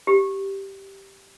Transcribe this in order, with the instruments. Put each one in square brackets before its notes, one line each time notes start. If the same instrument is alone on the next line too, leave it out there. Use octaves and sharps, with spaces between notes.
[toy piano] G4